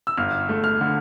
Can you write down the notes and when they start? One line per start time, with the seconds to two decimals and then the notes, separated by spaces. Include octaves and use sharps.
0.07 E6
0.17 G1 F6
0.49 A3
0.64 F6
0.81 D3